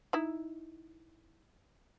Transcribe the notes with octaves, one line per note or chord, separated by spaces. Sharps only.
D#4 E4